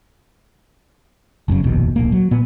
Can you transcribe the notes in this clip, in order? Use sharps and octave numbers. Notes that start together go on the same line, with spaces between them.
F1 F#2 A#2 C#3
F1 A#1 D#2 B2
D1 A#1 A#3
F#3
A#2 B3